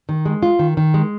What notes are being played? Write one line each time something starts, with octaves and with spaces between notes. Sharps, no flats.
D#3
G#3
F4
D#3
D#3
G#3